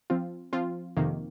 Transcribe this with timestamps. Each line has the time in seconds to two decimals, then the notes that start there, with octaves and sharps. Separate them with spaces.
0.10 F3 C4 F4
0.53 F3 C4 F4
0.97 F2 C3 D#3 A#3